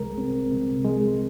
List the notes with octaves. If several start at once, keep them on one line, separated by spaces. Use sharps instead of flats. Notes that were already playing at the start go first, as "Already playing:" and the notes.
Already playing: C2 G#3 A#4
C4
C3
G#3